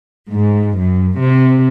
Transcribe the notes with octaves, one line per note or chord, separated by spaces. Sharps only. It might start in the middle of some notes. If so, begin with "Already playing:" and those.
G#2
F#2
C3